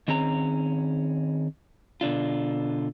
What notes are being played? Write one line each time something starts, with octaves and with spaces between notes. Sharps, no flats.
D#3 C4 C#4 G#4 A#5
B2 D3 D4 F4